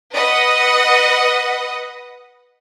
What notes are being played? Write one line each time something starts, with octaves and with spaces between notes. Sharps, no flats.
B4 D#5 F#5